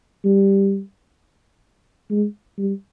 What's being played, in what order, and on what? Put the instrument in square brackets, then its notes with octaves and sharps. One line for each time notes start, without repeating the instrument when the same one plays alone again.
[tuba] G3
G#3
G3